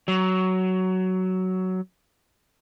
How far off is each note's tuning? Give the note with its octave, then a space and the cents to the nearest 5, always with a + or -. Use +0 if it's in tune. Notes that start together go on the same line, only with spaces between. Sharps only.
F#3 +10